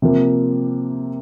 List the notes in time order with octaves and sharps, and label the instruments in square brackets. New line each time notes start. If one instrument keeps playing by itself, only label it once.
[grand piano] C3 F3 A#3